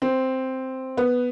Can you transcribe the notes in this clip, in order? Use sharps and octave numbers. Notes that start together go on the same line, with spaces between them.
C4
B3